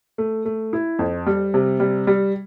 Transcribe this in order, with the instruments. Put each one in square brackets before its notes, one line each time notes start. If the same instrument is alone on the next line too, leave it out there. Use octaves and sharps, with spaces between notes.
[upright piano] A3
A3
E4
F2
G3
C3
G3
G3